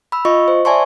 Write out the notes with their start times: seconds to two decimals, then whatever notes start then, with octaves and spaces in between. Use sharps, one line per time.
0.12 B5 E6
0.25 F4 D#5 C#6
0.48 C5
0.65 D5 E5 G#5 A5 C6 C#6